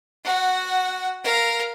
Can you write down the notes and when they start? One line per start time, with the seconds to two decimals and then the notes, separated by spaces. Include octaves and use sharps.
0.25 F#4 F#5
1.24 A#4 F5